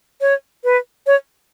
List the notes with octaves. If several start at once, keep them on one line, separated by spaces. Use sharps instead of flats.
C#5
B4
C#5